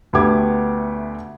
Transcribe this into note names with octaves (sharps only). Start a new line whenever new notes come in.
D2 A3 B3 G4 D6 G#6